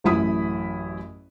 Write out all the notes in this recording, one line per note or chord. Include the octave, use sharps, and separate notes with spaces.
A1 F#2 E4 B5 D#6